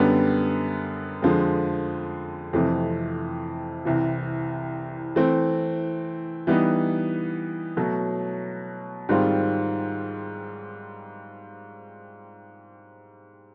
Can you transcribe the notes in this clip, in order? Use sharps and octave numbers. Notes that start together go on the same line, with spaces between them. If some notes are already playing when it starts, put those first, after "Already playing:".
Already playing: F#2 D3 G3 B3
F2 D3 F3 G#3
F2 C3 E3 A3
C2 C3 E3
E3 A3 C4
E3 G3 B3 D#4
B2 F#3 A3
G#2 D#3 G3 C4 F4